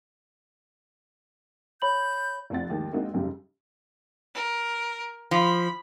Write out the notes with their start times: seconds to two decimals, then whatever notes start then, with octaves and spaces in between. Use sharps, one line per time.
1.82 C#5 B5 G6 F#7
2.50 F1 F3 C4 F#5 A6
2.70 D#2 G#2 D#3
2.93 G#3 A#3 C4 D4 D#4 F#4
3.14 B1 F#2 C#3 G3
4.34 A#4
5.31 F3 B5